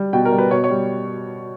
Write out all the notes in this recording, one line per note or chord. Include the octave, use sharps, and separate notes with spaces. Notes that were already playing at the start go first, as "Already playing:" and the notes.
Already playing: G3
B2 G5
A#4
G3
B4
B2 C#5
C#5
G3